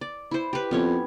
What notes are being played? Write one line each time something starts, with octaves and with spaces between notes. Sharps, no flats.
D5
E4 C5
G4 B4
F2 B3 C#4 C#5